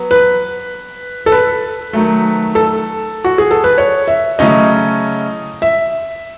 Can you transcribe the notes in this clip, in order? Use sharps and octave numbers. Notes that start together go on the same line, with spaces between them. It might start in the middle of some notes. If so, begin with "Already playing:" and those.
Already playing: F#3 B3
B4
A4
B4
D#3 F#3 A3
A4
F#4
G#4
A4
B4
C#5
E5
C#3 F#3 A3 C#4 E4 D#5
E5